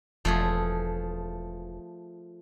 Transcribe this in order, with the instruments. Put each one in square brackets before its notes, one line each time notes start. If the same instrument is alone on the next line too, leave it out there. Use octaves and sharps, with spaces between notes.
[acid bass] E1 [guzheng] F3 A3 G#4